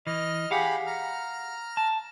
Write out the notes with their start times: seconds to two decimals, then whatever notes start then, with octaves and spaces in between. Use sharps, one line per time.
0.07 E3 D#5 F6
0.51 G4 G#4 F5 F#5 B5
0.86 A#5 F6
1.77 A5